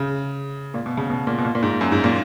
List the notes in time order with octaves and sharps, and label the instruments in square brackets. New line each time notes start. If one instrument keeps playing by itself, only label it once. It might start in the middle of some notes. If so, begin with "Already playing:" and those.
Already playing: [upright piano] C#3
A#2
B2
C#3
B2
A#2
B2
A#2
A#2
G#2
F#2
G#2
A#2